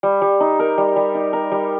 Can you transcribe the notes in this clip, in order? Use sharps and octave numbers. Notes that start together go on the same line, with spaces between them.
G3
G3
D#4
A#4
G3
G3
D#4
A#4
G3